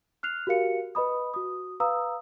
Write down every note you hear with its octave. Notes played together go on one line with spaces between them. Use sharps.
F6 F#6 C7 F7
F#4 G4 A#4 F5 C#7
B4 D#5 B5 D#6
F#4 D#6
B4 F5 A#5 D#6 E6